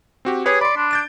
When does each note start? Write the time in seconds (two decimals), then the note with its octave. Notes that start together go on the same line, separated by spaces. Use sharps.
0.25 C4 F#4 G4
0.45 G4 G#4 B4 C#5
0.61 D5 B5 C6
0.77 D4
0.91 G6 A6 D7